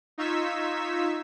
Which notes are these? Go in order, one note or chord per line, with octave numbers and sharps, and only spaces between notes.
D#4 F4 C#6 E6 G#6 B6